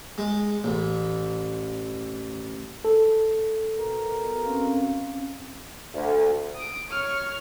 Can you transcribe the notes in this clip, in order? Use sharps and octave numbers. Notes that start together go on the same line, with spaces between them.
G#3
A1
A4
B2 A#4
C4 C#4 F5
D2
D#6 D7
C#5 F6